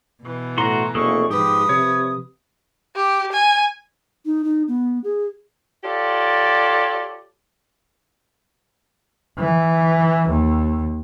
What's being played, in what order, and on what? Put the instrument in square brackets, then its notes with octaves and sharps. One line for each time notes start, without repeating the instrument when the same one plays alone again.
[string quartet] B2 E3
[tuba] A2 [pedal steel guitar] F#4 C6 [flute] A#5
[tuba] F1 [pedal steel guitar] A#3 G#4 A4 [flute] C#6
[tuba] G#2 [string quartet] F3 B4 [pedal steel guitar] G4 [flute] D#6
[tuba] C3 [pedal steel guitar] C#5
[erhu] G4
G#5
[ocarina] D#4
D#4
B3
G#4
[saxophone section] F4 G4 A4 C#5 D5
[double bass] E3
D#2